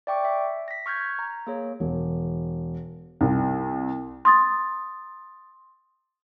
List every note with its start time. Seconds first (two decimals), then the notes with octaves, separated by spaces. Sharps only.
0.07 D5 E5 G5 C#6 D6
0.25 E5
0.68 A#6 B6
0.86 C#6 F6 G6 G#6
1.19 A#5
1.47 A#3 G#4 C#5
1.80 E1
3.21 C2
4.25 C6 D#6 A6